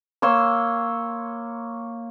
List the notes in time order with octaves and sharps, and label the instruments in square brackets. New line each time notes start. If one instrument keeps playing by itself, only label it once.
[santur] A#3 C#5 C6 E6